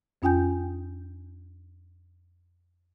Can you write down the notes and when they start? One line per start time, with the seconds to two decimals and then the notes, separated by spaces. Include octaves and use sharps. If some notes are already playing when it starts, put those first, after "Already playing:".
0.22 F2 C#4 F4 G5 G#5 G6